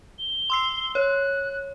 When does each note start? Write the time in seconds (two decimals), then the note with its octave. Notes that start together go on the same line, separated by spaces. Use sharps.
0.18 G7
0.50 C6 E6 C7
0.95 C#5 F#6